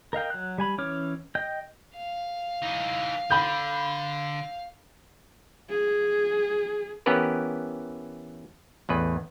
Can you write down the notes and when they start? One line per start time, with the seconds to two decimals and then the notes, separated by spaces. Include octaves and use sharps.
0.13 A#4 D#5 F5 G5
0.30 F#3 F#6
0.58 G3 G#5 B5
0.78 E3 C#4 C#5 D6 F6
1.35 D#5 G5 G6
1.96 F5
2.62 E3 D#4
3.31 D3 B5 G6
5.69 G#4
7.06 E3 B3 C#4 G4 A#4 B4
8.89 A1 E2 B4